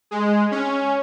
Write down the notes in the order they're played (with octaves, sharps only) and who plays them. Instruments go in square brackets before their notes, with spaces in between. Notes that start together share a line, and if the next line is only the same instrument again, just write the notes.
[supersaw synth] G#3
C#4